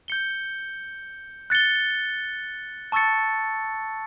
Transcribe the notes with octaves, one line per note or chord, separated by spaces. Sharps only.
G6 C#7 G7
F#6 A6 C#7 G7
A5 C#6 E6 A6 C#7